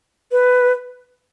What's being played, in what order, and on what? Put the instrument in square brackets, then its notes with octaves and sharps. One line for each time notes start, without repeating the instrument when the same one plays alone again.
[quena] B4